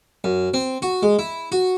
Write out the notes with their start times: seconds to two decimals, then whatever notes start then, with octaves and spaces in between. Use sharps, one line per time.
0.24 F#2
0.54 C4
0.82 F#4
1.03 G#3
1.19 E4
1.52 F#4